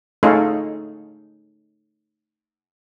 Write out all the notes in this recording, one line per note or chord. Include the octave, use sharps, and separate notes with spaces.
A3 C#4 D#4 F4 G#4 A4